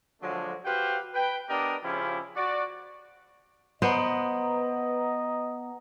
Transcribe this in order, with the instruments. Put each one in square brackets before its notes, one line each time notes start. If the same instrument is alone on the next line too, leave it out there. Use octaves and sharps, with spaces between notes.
[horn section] D3 F3 F#3 G#3 A3 D4
F#4 G4 B4 C5 F5 G5
B4 G5
B3 D4 G4 A#4 D5 D#5
C#3 F3 C#4 E4 F4 G4
F#4 D5
[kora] B3 C5 [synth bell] B4 F#5 A#5 [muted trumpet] D#5